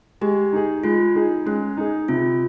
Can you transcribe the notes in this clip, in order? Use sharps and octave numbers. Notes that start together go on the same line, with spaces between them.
G#3 G4
D#4 G#4
G#3 F4
D#4 G#4
G#3 C#4
D#4 G#4
C3 F4